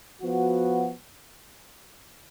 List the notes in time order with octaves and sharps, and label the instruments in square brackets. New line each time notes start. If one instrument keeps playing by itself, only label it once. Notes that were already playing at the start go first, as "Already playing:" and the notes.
[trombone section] F3 B3 F#4